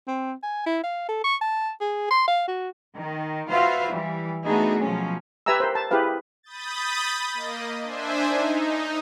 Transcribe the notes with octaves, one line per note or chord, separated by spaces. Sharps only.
C4
G#5
E4
F5
A4
C#6
A5
G#4
C6
F5
F#4
D#3
F4 F#4 B4 C5 E5 F5
E3 G3
A3 B3 D4 D#4 F#4 G#4
B2 F3 F#3 C#4
G4 B4 E5 G#5 A#5 E6
A#4 C5
A5
E4 G4 G#4 B4 F5
B5 D#6 G6 A6
A#3 D#5
D4 C5 E5 G#5
D#4